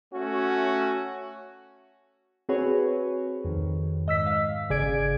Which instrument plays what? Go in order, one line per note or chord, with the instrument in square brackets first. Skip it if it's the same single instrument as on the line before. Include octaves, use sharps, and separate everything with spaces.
[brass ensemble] A3 C#4 F#4
[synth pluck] C4 F#4 G#4 B4 C#5
F2 D#3
G#2 D#5 E6 B6
F5
G1 C#3 G#4 D5 G#6 D7